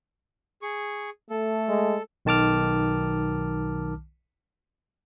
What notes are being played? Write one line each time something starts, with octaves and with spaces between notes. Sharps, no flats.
G#4 C#6
A3 A4
G#3
B1 D#3 A5 D6 F6